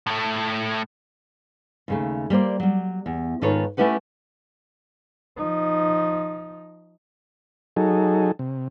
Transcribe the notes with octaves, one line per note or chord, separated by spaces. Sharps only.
A2 A3
D#2 C#3 A3
G3 A#3 C5 D5
F#3 G3
E2
G#2 D#3 F4 A4 B4 C#5
A3 C#4 E4 G4 B4 F#5
F3 D#4
F#3 D#4 G#4 A4
C3